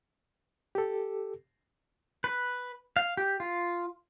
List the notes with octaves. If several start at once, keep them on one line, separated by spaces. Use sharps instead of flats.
G4 A4
B4
F5
G4
F4